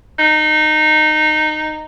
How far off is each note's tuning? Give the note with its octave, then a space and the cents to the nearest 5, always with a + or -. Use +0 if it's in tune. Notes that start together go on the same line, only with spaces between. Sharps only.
D#4 -15